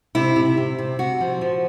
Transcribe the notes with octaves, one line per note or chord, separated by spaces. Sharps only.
C3 E4
C3
C3
C3
C3 F#4
F3
F3